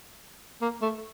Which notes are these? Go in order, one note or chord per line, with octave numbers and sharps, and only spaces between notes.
A#3
A3